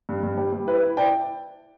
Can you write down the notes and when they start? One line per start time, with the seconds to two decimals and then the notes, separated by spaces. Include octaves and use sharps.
0.09 G2
0.23 G2
0.37 G3
0.52 G3
0.67 E4 B4
0.82 E4
0.97 E4 D5 G5